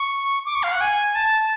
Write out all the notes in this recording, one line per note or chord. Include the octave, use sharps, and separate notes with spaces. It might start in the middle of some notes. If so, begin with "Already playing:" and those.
Already playing: C#6
D6
C#6
F5
F#5
G#5
A5